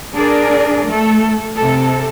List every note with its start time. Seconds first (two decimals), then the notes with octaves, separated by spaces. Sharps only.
0.14 D4 G#4 A#4 D5
0.88 A3 A4
1.56 C3 A4